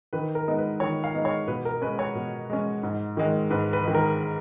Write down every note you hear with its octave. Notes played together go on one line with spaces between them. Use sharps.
D#3 B4
A#4
G#3 B3 D#4
B4
D#3 C#5
F5
G#3 B3 D#4
C#5
B2 B4
A#4
G#3 C#4 B4
C#5
B2
G#3 C#4
G#2
D#3 G#3
G#2 B4
B4
D#3 G#3
A#4